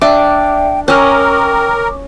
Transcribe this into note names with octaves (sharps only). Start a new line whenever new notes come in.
D4 D5 E5 G5 D6
C#4 A#4 D#5 G5 D6 E6 F6